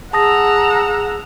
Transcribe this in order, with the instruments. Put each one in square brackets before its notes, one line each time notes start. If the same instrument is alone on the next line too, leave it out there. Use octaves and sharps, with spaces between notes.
[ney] G#4 [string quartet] F#5 A#5 E6 [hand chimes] A5 D#6 A#6